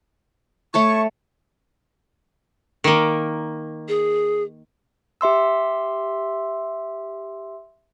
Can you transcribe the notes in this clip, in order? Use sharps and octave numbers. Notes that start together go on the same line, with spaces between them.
A3 C#5 A5 C#6
D#3 A#3
G#4
G4 E5 C6 E6